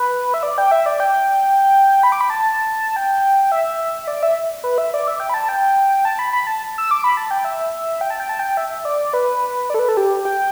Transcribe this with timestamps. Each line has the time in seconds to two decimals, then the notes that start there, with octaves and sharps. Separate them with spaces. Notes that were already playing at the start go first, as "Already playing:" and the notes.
Already playing: B4
0.34 E5
0.43 D5
0.58 G5
0.71 E5
0.86 D5
1.00 G5
2.03 B5
2.12 D6
2.21 B5
2.30 A5
2.96 G5
3.52 E5
4.07 D5
4.23 E5
4.64 B4
4.78 E5
4.94 D5
5.07 E5
5.20 G5
5.30 B5
5.34 A5
5.49 G5
6.05 A5
6.19 B5
6.33 B5
6.47 A5
6.78 E6
6.91 D6
7.04 B5
7.17 A5
7.31 G5
7.45 E5
8.01 G5
8.10 A5
8.20 G5
8.29 A5
8.39 G5
8.57 E5
8.85 D5
9.13 B4
9.70 D5
9.74 A4
9.79 B4
9.89 A4
9.97 G4
10.25 G5